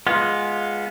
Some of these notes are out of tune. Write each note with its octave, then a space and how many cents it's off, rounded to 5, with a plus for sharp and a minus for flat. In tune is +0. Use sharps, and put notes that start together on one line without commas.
G#3 +0 B3 -15 F4 +0